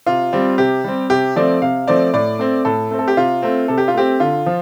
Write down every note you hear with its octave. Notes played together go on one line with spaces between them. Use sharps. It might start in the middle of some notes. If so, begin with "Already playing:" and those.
C3 F4
G3 C4
C3 G4
G3 C4
C3 G4
F3 A3 C4 D5
C3 F5
F3 A3 C4 D5
A2 D5
A3 C4
A2 A4
A3 C4
A4
G4
C3 F4
A3 C4
C3 A4
G4
F4
A3 C4 G4
D3 F4
F3